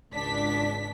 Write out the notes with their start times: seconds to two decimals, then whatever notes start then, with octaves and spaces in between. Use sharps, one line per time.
0.14 G#1 C#2 D4 B6